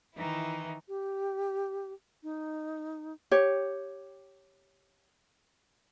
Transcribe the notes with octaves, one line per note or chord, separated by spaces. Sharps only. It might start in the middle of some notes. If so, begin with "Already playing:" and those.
D#3 E3 D#4 E4
G4
D#4
G4 C#5